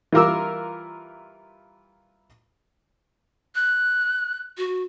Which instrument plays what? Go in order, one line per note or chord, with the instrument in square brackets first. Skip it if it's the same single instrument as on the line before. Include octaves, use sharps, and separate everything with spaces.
[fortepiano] E3 G3 F4 A#4 D6 E6
[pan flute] F#6
F#4